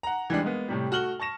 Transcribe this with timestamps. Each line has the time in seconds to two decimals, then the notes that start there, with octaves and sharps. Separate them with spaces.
0.03 F#5 A#5
0.30 E3 G3 G#3 D4
0.43 G#3 A#3 B3
0.68 A2 C3 G3
0.91 A3 F#4 F6 F#7 G7
1.19 A5 C#6 A#6 E7